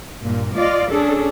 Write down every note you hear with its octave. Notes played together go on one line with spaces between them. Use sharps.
G2 A#2
F4 D5 D#5 F5
C#4 D4 G#4 A4